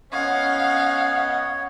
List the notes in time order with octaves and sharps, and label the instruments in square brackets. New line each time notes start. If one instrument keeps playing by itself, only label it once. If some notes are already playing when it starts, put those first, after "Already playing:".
[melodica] B3 D#5 [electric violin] C#4 F#5 [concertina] C#5 [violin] F5